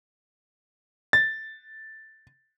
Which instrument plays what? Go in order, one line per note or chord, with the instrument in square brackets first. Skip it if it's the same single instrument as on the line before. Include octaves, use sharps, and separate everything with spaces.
[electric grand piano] A6